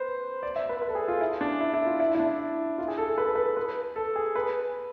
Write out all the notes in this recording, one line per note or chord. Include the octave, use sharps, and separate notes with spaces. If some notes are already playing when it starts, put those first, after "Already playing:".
Already playing: B4 C5
D5
E5
B4
B4
A4
G#4
F4
E4
D4
E4
E4
F4
E4
E4
D4
F4
G#4
A4
A4
B4
A4
B4
B4
A4
G#4
B4